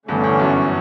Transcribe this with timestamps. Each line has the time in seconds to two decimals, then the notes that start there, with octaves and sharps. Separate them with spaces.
0.08 E2 G2 D3 A3 C#4
0.24 E2
0.39 F#2